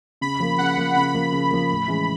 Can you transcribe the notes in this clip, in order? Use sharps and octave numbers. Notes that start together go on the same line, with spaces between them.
C#3 B5
F3 A#3
C#3 F#5
F3 A#3
C#3 B5
F3 A#3
C#3
F3 A#3
A2
E3 G#3 C#4